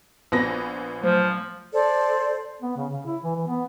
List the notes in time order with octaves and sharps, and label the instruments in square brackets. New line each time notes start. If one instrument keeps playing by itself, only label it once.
[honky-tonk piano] A#1 B3 A#6
[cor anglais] F3 [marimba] F#3 A3 C5
[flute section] A4 C5 D5
[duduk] B3
C#3
C#3
E4
E3
E3
B3